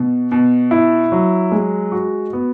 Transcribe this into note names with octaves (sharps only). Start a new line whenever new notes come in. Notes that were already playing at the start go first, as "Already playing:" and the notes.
Already playing: B2
B2
E4
F#3
G#3
F#4
B3